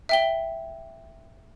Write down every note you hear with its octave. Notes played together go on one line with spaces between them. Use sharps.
E5 G5 G7